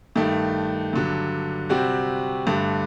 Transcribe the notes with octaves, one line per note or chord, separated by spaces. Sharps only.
G2 D#3 A3
G2 D3 F#3
C3 G3 C4 F#4
G2 D3 A3